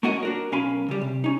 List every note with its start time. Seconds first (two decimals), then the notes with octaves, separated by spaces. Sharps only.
0.03 A3 A#3 C#4 F#4 A#4 D#5
0.23 D4 F#4 A#4
0.52 B1 C#4 A#4 F5 G#5 B5
0.89 C#3 G3
1.01 C3
1.24 C#4 D#4